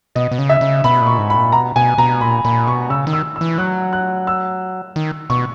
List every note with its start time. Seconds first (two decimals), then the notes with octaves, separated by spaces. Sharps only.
0.15 B2 D#5
0.31 B2
0.39 C#3
0.49 E5
0.61 C#3
0.84 B2 B5
1.01 A#2
1.07 C#6
1.18 G#2
1.30 B5
1.36 A#2
1.52 B2 A#5
1.76 B2 G#5
1.98 B2 A#5
2.21 A#2 B5
2.45 A#2 B5
2.67 B2 C#6
2.90 C#3 E6
3.07 D#3
3.13 E6
3.36 E6
3.41 E3
3.58 F#3 F#6
3.93 F#6
4.27 E6
4.96 D#3
5.30 B2 C#6